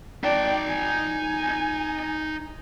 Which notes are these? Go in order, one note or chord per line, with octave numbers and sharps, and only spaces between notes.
D#4 D5 G5 A5
G#5